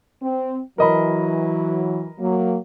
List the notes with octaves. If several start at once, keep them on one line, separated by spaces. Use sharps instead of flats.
C4
E3 F#3 A#4 D#5 B5
F#3 A#3